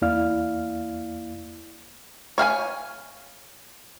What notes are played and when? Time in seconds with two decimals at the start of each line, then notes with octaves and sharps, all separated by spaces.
0.02 E2 A#3 E4 D5 F5 F6
2.38 C#5 F5 G5 G#5